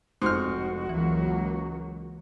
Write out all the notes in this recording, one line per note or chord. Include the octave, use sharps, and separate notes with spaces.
F1 G#2 F#4 C5 C6 F6 G6
C#2 E3 F#3 A#3